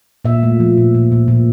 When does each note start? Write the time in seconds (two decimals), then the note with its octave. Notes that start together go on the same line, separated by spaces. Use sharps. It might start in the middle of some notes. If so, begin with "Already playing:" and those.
0.25 A#2 E5
0.43 A3
0.60 F3
0.77 A#2
0.94 A#2
1.12 A#2
1.28 A#2